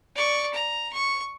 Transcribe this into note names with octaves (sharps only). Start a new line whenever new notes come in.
D5 C#6
A#5
C#6